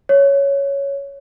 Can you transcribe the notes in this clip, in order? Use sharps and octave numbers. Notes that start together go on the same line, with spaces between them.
C#5